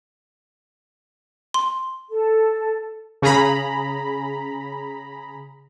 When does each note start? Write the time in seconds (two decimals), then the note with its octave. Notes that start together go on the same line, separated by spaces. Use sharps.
1.54 C6
2.10 A4
3.22 C#3 G#4 A#5 B5